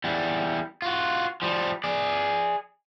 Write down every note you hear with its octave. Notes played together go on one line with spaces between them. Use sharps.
E2 G3
F4 F#4
F3 G3
G#4 D5